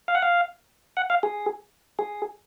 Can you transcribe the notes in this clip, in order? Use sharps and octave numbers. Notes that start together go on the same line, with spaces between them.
F5
F#5
F5
F#5
F5
G#4
G#4